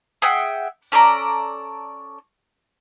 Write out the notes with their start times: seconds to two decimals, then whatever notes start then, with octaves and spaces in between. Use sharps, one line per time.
0.22 G#4 E5 F#5 G5
0.92 C#4 A4 D5 A#5